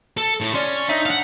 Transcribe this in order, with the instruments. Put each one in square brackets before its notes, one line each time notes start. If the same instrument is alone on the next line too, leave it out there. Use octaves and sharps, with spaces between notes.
[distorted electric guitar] A4
A2
[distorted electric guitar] C#4 [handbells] D5 C6
[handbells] D4 E5 [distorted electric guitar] D#4
[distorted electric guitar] F5 F#5